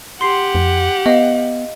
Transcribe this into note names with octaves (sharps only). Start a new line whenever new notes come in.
G4 F#5 C6 C7
F2
B3 D#5 F5